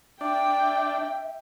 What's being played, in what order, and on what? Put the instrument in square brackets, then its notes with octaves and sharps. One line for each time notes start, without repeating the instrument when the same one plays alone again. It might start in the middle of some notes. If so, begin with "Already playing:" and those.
[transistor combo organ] D4 [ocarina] E5 [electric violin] G5